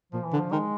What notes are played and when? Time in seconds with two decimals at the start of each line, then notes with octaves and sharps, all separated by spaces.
0.12 A#2 F3
0.25 E3
0.33 D3
0.38 F3
0.52 D#3 G#3